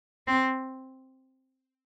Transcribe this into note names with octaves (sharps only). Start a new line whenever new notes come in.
C4